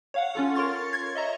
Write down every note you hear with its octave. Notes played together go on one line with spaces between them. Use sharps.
C#5 F5 F#5
C#4 F4 A4
A#4 C#5 C6 C#6 A6
G#6
D#5 E5 A#5 C#6